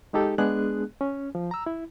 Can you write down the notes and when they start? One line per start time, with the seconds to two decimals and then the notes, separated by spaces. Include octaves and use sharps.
0.13 G#3 D#4 G4 A4
0.38 G#3 B3 D4 G#4 F#6
1.01 C#4
1.35 F3
1.51 A#5 E6
1.66 E4